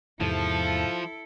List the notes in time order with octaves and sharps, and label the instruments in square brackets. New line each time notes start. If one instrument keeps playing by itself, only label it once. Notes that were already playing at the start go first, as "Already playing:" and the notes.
[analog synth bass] E2 [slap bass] G#2 C3 [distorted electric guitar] F3 [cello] E4 A4